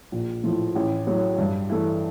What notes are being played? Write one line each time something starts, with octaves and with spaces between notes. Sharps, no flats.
A#1
A2 F3
A1
A2 F#3
G2
E3 A3